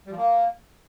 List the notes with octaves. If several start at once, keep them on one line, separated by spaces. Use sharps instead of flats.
G3
F3
A#3